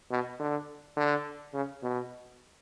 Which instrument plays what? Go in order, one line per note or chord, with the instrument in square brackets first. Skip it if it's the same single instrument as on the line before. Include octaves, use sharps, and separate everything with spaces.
[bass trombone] B2
D3
D3
C#3
B2